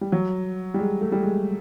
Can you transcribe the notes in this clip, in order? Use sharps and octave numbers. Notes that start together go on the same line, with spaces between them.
G3
F#3
G3
G#3
A3
G3
G#3